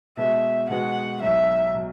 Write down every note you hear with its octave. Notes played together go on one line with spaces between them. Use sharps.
B2 G#3 B3 F#4 E5
B2 G#3 B3 F#4 F#5
B1 B2 F#3 E5
B2 F#3